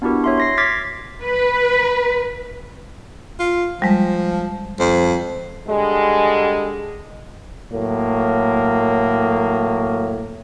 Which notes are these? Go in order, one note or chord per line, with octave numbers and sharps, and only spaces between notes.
B3 D4 E4 F#4 G4 A#4
C#5 E5 C6
C6 A#6 C7
D6 F6 G#6 A6 B6
B4
F4
F3 G3 G#3
F2
D3 G3 G#3
A2 F#3 A#3